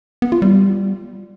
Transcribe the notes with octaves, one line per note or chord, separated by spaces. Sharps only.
B3
F4
G3